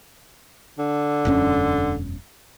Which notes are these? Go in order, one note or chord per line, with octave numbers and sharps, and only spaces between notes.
D3
E1 F#2 C#4